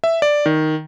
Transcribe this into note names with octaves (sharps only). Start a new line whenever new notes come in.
E5
D5
D#3